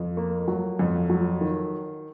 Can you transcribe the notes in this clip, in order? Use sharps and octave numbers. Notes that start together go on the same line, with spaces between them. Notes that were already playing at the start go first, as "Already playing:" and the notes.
Already playing: F2
A#3
F#3
F2
F#3
D#3